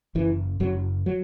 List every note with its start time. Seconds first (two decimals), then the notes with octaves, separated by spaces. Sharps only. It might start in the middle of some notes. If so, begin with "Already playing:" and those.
0.15 F#1 E3
0.60 F#1 F#3
1.06 F#3